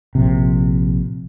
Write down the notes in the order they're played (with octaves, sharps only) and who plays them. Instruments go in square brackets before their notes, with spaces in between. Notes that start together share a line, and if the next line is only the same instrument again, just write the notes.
[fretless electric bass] A#1 C3